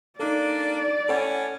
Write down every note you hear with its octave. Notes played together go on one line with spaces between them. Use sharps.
A#3 D4 D#4 A4 D5
A2 C#4 A4 C#5 F#5